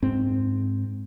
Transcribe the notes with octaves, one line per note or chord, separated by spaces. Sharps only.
G#2 C4